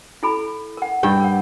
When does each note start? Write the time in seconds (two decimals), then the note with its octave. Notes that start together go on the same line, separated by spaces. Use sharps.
0.23 E4 A4 B5
0.77 A#4 F#5
1.03 G2 G5
1.20 A#4 F#5